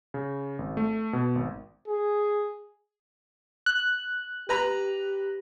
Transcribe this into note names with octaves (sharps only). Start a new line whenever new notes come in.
C#3
G#1
A3
B2
G#1
G#4
F#6
G4 B4 A#5 B5